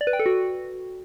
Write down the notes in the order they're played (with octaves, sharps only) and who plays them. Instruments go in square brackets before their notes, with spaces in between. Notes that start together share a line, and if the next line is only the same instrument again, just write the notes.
[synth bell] D5
B4
G5
A4
F#4